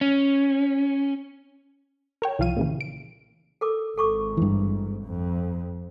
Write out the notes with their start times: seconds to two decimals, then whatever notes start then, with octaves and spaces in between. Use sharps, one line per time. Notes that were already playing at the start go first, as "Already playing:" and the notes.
0.01 C#4
2.22 A#4 C#5 G5
2.39 C2 F3 F4 F5 D#7
2.57 A#2 C#3 E3
2.81 D7
3.61 A4 A#4 D6
3.98 G#1 G#2 A4 C#6 D6
4.37 G2 E3
5.04 F2